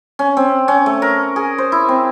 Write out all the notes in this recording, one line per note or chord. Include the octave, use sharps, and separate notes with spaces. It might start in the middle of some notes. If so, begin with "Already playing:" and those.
C#4
C4
C#4
A3
A#4
G#4
C5
E4
C4